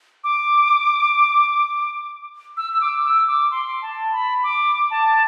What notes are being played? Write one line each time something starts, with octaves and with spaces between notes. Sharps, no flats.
D6
E6
E6
D6
E6
D6
C6
A5
B5
D6
A5